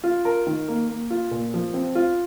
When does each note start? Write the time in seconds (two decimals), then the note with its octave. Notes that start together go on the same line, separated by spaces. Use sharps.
0.04 F4
0.25 A#4
0.47 D#3
0.68 A#3
0.89 A#3
1.10 F4
1.31 A#2
1.54 F3
1.74 C4
1.95 F4